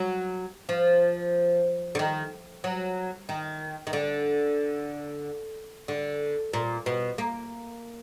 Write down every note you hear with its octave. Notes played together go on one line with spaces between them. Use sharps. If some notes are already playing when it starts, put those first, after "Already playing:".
Already playing: F#3
F3
D3
D#3
F#3
D#3
D#3
D3
D3
A#2
B2
A#3